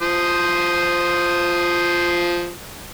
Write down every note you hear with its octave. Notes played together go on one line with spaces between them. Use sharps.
F3 C5 D#6